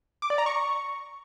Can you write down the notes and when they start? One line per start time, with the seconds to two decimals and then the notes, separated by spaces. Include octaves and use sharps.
0.22 D6
0.30 D5
0.38 A#5
0.46 C#6